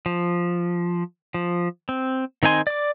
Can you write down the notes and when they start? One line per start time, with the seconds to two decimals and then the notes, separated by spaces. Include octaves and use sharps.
0.06 F3
1.34 F3
1.89 C4
2.43 D#3 C4 D#4 G#5 C6
2.67 D5 D6